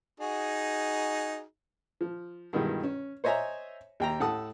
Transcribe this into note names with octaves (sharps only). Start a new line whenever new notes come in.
D#4 F#4 G#4
F3
G2 B2 D#3 E3 G#3
C#4
C5 C#5 D#5 E5 G#5 A#5
D#2 G5 A#5
A2 A4 F#5 A5 D#6